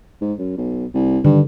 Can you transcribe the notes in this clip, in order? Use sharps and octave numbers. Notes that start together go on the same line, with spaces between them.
G#2
F#2
B1
C2
G2 D3 D#3